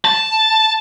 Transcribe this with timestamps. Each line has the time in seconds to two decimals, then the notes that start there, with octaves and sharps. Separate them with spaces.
0.05 A5